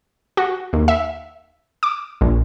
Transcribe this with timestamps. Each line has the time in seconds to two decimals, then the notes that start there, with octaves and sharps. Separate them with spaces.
0.37 F#4
0.73 D#2
0.88 E5
1.83 D6
2.21 A#1